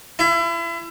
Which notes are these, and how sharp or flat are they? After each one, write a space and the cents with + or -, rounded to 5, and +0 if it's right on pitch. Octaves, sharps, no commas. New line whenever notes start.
E4 +35